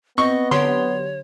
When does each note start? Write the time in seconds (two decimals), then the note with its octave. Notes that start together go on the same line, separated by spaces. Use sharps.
0.18 B3 C4 D#5 C#6
0.51 D3 F#3 G4 C#5 C6